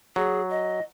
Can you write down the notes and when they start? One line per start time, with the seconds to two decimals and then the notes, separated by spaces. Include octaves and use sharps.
0.16 F#3 G#4
0.50 D#5